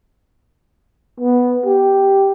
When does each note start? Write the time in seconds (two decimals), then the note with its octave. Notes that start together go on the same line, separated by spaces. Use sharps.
1.20 B3
1.66 G4